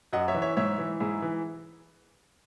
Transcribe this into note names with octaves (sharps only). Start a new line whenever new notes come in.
F#2 D#5 F#5
C#5 E5
E3
C#5 E5
G#2 C#5 E5
E3
G#2 E4 G#4
E3